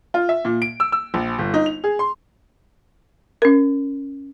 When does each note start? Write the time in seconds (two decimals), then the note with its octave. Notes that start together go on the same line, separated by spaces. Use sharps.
0.14 F4
0.29 E5
0.45 A#2
0.62 D7
0.80 E6
0.92 E6
1.14 A#1
1.39 G1
1.54 D#4
1.66 F7
1.84 G#4
1.99 C6
3.42 C#4 A#4